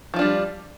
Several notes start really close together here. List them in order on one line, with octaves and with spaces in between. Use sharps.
F3 F4 D4 G3